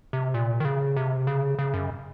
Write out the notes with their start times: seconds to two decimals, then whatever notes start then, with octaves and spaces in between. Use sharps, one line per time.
0.13 C3
0.34 A#2
0.60 D#3
0.65 C#3
0.96 C3
1.27 C#3
1.59 C#3
1.74 F#2